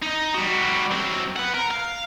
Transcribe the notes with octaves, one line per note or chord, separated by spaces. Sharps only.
D#4 D#5
G3 F#4
F#3 C4
B4 F#5
A#4
F5